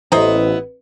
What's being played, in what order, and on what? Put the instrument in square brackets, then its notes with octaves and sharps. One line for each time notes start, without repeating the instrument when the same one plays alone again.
[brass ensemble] A1 [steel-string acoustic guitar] B3 E4 [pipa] C5 D#5 A#5